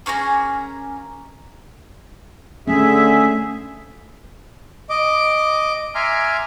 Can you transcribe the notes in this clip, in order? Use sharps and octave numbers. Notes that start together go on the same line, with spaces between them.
A#3 C#4 G#4 A#5
D3 A3 C#4 G#4 E5
D#5 D6
E5 G#5 A#5 C6 D6 F6